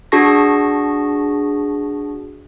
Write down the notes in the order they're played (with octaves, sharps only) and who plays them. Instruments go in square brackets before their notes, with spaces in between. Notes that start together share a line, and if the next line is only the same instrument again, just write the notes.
[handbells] D4 F#4 G#4 A5 C#6 A#6